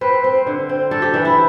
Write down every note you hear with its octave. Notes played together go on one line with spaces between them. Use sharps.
C4 B4
C4
D3
C4
D4 A4
G4
E3 D4
E4